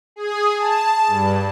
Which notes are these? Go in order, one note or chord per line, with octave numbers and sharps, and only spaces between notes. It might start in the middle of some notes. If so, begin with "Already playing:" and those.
G#4
A5
G2